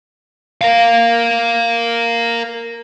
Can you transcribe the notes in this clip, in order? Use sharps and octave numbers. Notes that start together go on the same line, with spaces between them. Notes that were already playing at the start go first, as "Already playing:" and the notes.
A#4 F5